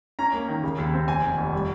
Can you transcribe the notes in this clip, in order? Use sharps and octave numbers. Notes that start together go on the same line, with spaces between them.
C#4 A#5
A#3
D#3
C#3
D#2
C4
F1 G#5
D#2
F1
G3